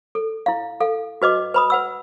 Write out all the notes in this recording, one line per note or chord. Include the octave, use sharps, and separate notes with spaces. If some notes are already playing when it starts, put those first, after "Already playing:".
A4
E4 F5
A4 F5
F#4 B4 D#5 D6
B4 B5 D#6
B4 F#5 E6